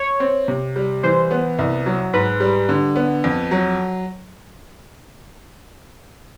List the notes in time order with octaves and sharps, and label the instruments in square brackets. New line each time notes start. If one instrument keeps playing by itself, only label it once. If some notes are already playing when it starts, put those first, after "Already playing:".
Already playing: [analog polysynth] C#5
[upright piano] C4
C3
G3
[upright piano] E3 [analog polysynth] C5
[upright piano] B3
C2
F#3
[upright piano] G#2 [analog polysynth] B4
[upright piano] G3
D3
B3
F2
F#3